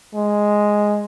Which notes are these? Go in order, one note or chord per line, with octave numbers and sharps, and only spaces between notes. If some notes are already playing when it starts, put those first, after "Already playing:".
G#3